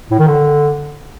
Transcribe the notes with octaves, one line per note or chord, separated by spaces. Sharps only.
A2
D#3
D3